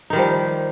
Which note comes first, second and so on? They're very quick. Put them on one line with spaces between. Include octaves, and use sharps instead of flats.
D#4 D#3 G3 F3